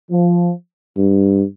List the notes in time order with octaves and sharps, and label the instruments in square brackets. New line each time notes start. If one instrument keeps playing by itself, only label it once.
[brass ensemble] F3
[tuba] G2